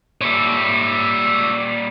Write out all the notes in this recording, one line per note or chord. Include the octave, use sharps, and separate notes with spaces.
A#2 G3 C#5 E5